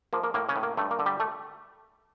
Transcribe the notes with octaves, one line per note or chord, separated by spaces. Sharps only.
F3 A#3
A#3
A2 A#3
C#3 C#4
A2
A#3
G2 A3
A#3
D3
G3 G4
A3 A4